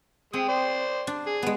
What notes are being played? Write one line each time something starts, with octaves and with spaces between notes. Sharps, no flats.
G#3 C4 D#6
C5 D5
D4
G#4
G#3 B3